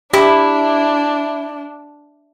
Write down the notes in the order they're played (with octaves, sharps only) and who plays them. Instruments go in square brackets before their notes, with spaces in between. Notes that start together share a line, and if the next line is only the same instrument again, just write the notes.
[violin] D4 [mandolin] E4 [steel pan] G4